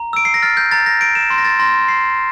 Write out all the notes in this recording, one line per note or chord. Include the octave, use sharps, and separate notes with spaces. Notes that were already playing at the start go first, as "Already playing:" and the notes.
Already playing: A#5
E6 D7
C7
A#6
F6 A6
G6
A#5 A6
A#6
G6 D7
E7
C6
A#6
A6
C6 A#6
C6 C7